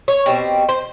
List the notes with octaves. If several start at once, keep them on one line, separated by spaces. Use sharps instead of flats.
C#5
B2 G3 C4
C5